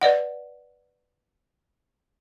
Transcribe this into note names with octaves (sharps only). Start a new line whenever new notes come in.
B4 D5 D#5 F#5